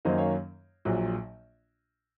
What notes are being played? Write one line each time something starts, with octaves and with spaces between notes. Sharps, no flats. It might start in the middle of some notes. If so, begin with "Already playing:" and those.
F#2 D#3 F#3 A#3 C#4 C5 D#5
C#5 F5
A#1 A#2 F#3